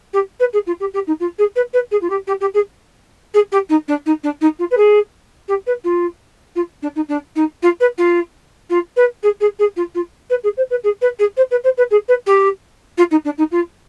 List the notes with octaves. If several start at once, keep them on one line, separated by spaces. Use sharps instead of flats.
G4
B4
G#4
F4
G4
G4
D#4
F4
G#4
B4
B4
G#4
F4
G4
G4
G4
G#4
G#4
G4
D#4
D4
D#4
D4
D#4
F4
B4
G#4
G4
B4
F4
F4
D4
D#4
D4
D#4
F4
B4
F4
F4
B4
G#4
G#4
G#4
F4
F4
B4
G#4
C5
B4
G#4
B4
G#4
C5
B4
C5
B4
G#4
B4
G4
F4
D#4
D4
D#4
F4